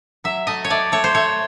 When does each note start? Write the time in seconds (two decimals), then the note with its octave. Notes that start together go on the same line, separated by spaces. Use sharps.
0.24 F#3 E5
0.47 A3 D#5
0.64 C#5
0.70 A3 D5
0.92 A3 C#5
1.04 C5
1.15 A3 C#5